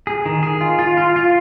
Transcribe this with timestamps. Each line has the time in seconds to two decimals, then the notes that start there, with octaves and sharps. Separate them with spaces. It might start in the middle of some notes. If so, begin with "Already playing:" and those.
0.07 G#4
0.25 D#3
0.43 G#4
0.61 F4
0.79 F4
0.97 F4
1.16 F4